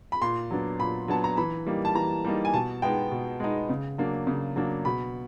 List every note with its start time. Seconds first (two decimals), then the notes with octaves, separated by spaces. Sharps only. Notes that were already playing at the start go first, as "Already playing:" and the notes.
0.12 B5
0.22 A#2 C6
0.51 F#3 B3 D4
0.79 A#2 B5
1.08 F#3 B3 D4 A5
1.24 A#5
1.37 E3 B5
1.67 G3 A#3 D#4
1.85 A5
1.95 E3 A#5
2.25 G3 A#3 D#4
2.45 G#5
2.53 B2 A5
2.82 G#3 B3 D#4 G5
3.11 B2
3.40 G#3 B3 D#4
3.69 C#3
3.98 F#3 A#3 D4
4.27 C#3
4.56 F#3 A#3 D4
4.85 B2 B5